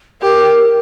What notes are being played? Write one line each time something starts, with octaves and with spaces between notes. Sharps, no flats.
G4 A#4